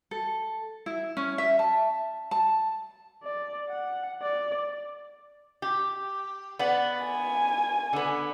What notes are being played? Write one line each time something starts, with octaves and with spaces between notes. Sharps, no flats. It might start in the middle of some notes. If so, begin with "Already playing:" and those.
A4
E4
C#4
E5
A5
A5
D5
F#5
D5
G4
B3 D5 F#5
G#5
D3 B3